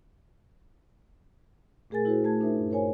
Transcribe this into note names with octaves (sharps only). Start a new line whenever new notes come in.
A#2 A3 G#4 A#4 G#5 A6
E4 F#4 G#4 A#4 C5
A3 A5 G#6
D4 D#4 A#4 C5 E5
G2
A#4 C5 C#5 G#5